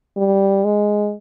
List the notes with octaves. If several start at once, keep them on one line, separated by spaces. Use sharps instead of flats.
G3
G#3